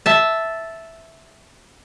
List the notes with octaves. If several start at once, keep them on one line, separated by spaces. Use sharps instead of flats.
E5 A5